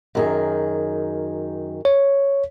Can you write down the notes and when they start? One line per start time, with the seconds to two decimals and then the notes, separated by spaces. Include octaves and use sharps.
0.15 F#2 D#3 G#4
1.85 C#5